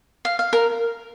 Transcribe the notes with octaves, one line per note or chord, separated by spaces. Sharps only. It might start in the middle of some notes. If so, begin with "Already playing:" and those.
F5
F5
A#4